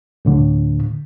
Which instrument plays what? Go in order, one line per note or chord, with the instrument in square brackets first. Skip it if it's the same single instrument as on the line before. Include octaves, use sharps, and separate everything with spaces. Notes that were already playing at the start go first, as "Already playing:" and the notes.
[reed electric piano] D2 A2 D3